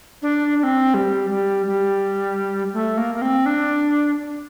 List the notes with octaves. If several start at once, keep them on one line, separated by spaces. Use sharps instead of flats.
D4
D4
C4
G3
G3
G3
A3
A#3
A#3
C4
D4